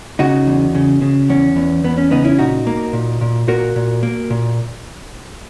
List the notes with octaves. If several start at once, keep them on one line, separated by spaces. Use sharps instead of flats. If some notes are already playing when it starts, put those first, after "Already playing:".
C#3 D#4 F#4
E2
C#3
C#3
E2 C#4
E2
E2 B3
C#4
C#3 B3 D#4
C#4 E4
A#2 D#4 F#4
A#3
A#2
A#2
A#2 F#4 A#4
A#2
A#3
A#2